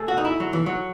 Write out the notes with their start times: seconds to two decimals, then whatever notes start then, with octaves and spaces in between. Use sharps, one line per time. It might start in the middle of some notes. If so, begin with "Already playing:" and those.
Already playing: A3 G#4
0.08 F#4
0.18 D#4
0.25 E4
0.40 F#3
0.53 E3
0.66 F#3